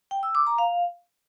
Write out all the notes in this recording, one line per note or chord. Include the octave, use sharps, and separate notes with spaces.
G5
E6
D6
A#5
F5